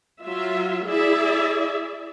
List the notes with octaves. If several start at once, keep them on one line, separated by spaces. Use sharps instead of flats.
F#3 F4 E5
E4 G#4 D5 E5